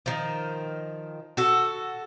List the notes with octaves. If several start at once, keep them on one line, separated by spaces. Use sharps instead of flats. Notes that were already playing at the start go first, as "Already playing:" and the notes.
D#3 F3
F#4 A4